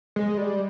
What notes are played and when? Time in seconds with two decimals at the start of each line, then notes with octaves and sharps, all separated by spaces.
0.16 G#3
0.37 G3